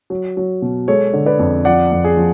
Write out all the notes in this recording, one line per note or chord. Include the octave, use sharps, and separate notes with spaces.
F#3
F#3
B2
G#3 A4 C#5
D3
B4 D5
F2
F3 D5 F#5
F2
G#4
F3